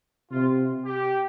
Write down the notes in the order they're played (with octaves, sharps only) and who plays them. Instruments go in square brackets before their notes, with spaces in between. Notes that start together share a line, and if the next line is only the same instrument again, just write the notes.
[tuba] C3 [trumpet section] F4
[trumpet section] G4